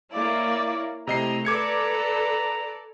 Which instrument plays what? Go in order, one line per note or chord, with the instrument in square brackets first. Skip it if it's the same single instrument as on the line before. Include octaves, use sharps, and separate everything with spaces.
[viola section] A#3 E4 C#5 [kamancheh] D5 F5
[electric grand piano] C3 D#5 C7 [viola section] A3 [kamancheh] E4 [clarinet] A#5
[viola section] A4 D5 [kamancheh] B4 [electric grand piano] D6 G#6 C#7